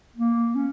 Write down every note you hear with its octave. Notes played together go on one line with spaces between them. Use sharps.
A#3
C#4